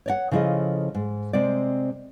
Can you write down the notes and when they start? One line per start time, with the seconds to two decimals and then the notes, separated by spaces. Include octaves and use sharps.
0.06 C#5 D5 F#5
0.31 C#3 F3 E4 A4 D#5
0.94 G#2
1.33 C3 G#3 C4 D5